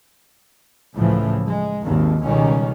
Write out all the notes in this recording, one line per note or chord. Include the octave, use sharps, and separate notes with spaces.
C#2 A2 C#3 E3 F3
G#3
G#1 D#2 A#2 D#3
C#2 B2 D#3 G3 C#4